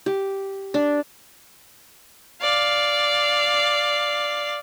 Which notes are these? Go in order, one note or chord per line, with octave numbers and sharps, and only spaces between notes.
G4
D4
D5 F5